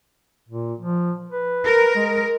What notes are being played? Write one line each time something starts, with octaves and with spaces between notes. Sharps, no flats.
A#2
F3
B4
A#4
G#3